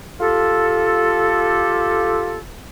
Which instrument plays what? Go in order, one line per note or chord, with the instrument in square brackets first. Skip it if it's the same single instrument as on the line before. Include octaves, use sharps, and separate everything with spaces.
[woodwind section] F4 G4 A4